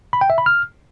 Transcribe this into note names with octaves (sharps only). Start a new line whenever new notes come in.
B5
G5
E5
B5
F6